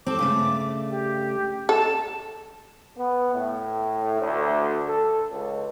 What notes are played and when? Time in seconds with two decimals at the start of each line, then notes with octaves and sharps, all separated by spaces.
0.06 C4 A4 D6
0.19 G2 C#3 A3
0.89 G4
1.69 A4 A5
2.97 B3
3.33 A2
4.19 D2
4.86 A4
5.30 C#2